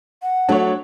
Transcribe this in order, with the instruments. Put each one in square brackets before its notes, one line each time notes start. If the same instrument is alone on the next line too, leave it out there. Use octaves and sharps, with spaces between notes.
[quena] F#5
[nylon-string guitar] F#3 A3 [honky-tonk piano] D4 C#5